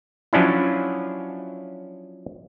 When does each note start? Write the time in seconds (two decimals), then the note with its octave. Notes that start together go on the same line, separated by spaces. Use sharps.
0.33 F3 F#3 C#4 D4 E4